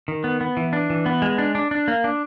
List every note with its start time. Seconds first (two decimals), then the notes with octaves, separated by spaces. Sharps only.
0.08 D#3
0.24 B3
0.41 B3
0.57 E3
0.73 D4
0.90 E3
1.06 B3
1.22 G#3
1.38 D4
1.55 D4
1.71 D4
1.88 A#3
2.04 D4